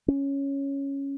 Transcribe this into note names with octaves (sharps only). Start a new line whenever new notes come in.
C#4